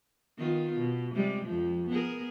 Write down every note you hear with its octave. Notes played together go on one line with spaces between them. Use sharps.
D#3 B3 F4
B2
C3 G3 G#3
F2 F3
B3 G#4 A#4